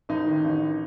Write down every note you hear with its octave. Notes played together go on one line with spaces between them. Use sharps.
A1 D#4
D#3
A1